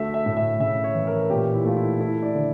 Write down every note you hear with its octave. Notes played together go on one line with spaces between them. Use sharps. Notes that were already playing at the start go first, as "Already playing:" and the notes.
Already playing: D2 A3 E5
E5
A2
E5
C#3 E5
C#5
E3
A#4
A#2 G4
E4
A3 F4
E4
A3 E4
D5
D3